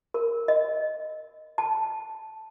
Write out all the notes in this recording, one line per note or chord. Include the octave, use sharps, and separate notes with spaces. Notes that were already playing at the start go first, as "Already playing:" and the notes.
A#4
D#5
A5